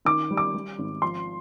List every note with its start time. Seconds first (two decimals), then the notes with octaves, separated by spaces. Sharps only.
0.05 D#3 D6
0.31 G3
0.37 D6
0.54 G3
0.78 G#1
1.02 F3 C6